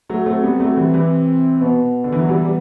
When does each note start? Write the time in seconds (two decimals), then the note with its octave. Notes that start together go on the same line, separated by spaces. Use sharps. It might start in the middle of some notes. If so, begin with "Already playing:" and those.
0.09 F#3 A3
0.26 F#3 A3 C4
0.43 G3 B3
0.60 F#3 A3
0.77 E3 G3
0.94 C3 E3
1.61 B2 B3
2.04 D3
2.12 E3
2.21 F#3
2.29 E3 G3
2.45 G3